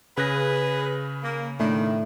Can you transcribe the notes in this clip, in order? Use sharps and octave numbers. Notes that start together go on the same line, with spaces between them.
C#3 G#4 B4 F#6 A#6
A#3
A2 D#3 D4